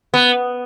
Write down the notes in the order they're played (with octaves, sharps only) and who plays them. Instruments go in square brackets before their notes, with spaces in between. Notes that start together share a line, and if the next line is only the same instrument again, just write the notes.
[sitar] B3